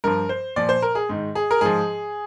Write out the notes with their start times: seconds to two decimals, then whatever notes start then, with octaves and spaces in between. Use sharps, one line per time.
0.04 G2 F3 A#4
0.29 C5
0.56 A#2 F3 D5
0.69 C5
0.82 A#4
0.95 G#4
1.09 G#2 D#3
1.35 G#4
1.51 A#4
1.61 G#2 F3 G#4